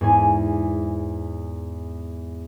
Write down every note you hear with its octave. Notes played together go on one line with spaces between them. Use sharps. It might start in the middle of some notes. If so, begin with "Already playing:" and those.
E2 G#2 G#5